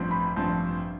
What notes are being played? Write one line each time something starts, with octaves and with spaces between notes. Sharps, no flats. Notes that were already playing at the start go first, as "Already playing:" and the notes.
Already playing: A1 G2 F3 C4
B5
A1 G2 F3 C4 A5